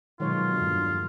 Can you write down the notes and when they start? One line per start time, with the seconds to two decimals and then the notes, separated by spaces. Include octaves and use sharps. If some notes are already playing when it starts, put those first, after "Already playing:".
0.20 B2 D#3 F#3 G#3 F4 C#5
0.54 E2 G2 A#2 D3 D4